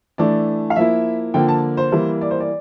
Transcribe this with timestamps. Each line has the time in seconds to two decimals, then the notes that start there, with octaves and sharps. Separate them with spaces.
0.18 E3 A3 D4 D5
0.70 F5
0.76 F3 A#3 E4 E5
1.34 D3 F3 A#3 G5
1.48 A5
1.77 C5
1.92 E3 G3 A#3
2.21 D5
2.31 C5
2.40 D5